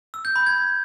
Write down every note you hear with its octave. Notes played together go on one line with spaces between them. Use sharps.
E6
G6
B5
G#6